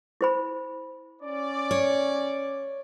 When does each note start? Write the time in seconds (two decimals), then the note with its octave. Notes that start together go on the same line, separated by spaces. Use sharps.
0.21 E4 C5 B5
1.22 C#4 D5
1.71 C#5